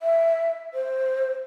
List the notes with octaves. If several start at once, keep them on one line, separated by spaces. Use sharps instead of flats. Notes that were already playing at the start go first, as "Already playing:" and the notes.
E5
C5